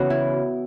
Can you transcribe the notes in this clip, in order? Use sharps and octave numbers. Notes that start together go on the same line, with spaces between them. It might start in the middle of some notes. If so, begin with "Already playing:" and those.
Already playing: C#3 E3 B3 F#4
E4